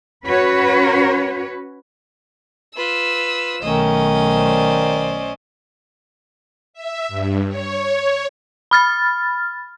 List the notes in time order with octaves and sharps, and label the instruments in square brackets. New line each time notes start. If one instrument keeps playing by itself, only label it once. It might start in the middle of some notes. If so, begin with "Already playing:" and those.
[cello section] C#4 F#4 B4 C#5
[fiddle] F4 B4 [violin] E6
[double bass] B1 A3 [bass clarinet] D#3 [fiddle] C#4 D#5
[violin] C5 D5
[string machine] E5
G2
C#5
[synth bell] B5 F6 A6